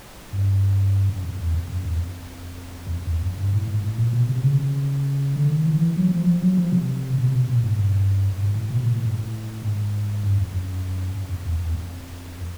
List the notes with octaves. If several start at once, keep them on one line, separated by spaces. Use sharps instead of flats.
G2
F#2
F2
E2
F2
F#2
E2
F2
E2
F2
E2
F#2
G2
A2
G#2
A2
A#2
B2
C3
C#3
C#3
D3
D#3
E3
E3
F#3
F3
F3
F#3
F3
C3
C3
B2
C3
B2
A#2
G#2
G2
G2
G#2
A2
B2
A#2
A2
G#2
A2
G#2
G2
F2
F#2
F#2
F2
E2
E2
F2